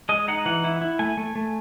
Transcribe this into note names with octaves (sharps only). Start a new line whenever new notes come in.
G#3 D#5
D#4 F#5
E3 F#5
E4
E4
A3 G#5
A3
A3